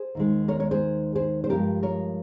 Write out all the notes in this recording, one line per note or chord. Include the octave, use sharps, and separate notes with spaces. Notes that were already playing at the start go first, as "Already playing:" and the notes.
Already playing: G#4 C5
D#2 D#3 G#3
A#4 C#5
A#4 C#5
G#4 C5
G#4 C5
C5
G2 F3 G#3 G4 A#4
A#4 C#5